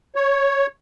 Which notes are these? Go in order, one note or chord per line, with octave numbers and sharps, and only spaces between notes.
C#5